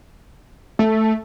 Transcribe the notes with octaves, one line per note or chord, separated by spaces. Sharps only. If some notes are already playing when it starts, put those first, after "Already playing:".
A3